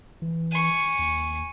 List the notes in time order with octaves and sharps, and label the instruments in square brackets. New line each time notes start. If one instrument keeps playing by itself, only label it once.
[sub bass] E3
[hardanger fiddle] G#5 C#6
[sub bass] D#2